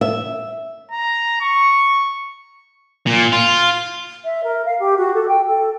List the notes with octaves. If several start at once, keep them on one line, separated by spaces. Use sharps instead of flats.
E5
A#5
C#6
A#2
F4
E5
A#4
F5
G4
F#4
A4
G5
A4